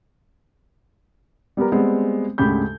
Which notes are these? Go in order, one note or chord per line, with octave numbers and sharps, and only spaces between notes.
G3 B3 G4 A#4
G3 G#3 B3 C4
D2 G#2 C#3 G4 B5 G6